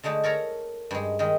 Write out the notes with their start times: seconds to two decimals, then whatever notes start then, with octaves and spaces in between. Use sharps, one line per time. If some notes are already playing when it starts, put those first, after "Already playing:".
0.03 D3 G#3 A3 D#4
0.24 A4 A#4 C#5 A#5
0.91 G2 G#3
1.19 D#3 G#3 D#5